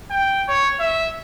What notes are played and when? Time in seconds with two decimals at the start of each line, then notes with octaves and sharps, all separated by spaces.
0.10 G5
0.48 C#5
0.80 E5